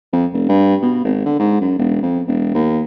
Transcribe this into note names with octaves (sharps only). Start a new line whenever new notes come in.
F2
F1
G2
B2
G#1
D3
G#2
F#2
E1
F2
E1
D#2